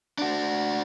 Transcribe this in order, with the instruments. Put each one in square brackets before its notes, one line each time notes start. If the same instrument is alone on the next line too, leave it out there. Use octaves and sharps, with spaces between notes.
[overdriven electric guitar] D4 F#4